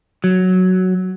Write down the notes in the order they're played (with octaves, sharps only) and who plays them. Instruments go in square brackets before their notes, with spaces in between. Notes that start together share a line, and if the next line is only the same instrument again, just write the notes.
[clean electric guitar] F#3